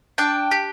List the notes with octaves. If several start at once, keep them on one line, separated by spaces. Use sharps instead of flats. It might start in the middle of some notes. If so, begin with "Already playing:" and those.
D4 G5 A5
G4